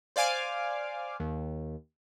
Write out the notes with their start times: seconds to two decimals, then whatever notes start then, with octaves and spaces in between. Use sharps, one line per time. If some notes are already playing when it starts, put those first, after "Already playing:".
0.16 C5 D5 F5 G#5 D6 F6
1.20 D#2